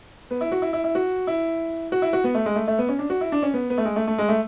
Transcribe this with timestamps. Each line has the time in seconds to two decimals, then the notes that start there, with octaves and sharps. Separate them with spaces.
0.31 B3
0.41 E4
0.52 F#4
0.62 E4
0.73 E4
0.84 E4
0.95 F#4
1.27 E4
1.92 F#4
2.02 E4
2.13 F#4
2.24 B3
2.35 A3
2.46 G#3
2.56 A3
2.68 A3
2.78 B3
2.88 C#4
2.99 D4
3.10 F#4
3.21 E4
3.32 D4
3.43 C#4
3.54 B3
3.70 B3
3.78 A3
3.85 G#3
3.96 A3
4.07 A3
4.18 G#3
4.29 A3